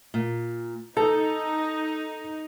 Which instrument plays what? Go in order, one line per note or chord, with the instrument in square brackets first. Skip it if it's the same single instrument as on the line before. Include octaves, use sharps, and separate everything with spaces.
[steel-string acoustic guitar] A#2
[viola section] D#4 [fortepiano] A4 [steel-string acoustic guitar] A#5